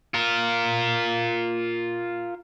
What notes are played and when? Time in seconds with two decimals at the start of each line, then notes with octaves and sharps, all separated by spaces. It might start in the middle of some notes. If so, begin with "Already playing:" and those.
0.14 F4 A#4